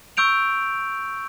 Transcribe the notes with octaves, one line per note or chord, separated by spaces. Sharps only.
C#6 E6 G6 D7 F7